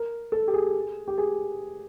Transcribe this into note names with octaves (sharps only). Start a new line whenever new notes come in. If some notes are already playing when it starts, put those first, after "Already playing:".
Already playing: A#4
A4
G4
G#4
G4
G#4